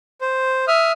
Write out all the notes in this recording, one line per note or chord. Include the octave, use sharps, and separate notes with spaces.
C5
E5 D#6 F6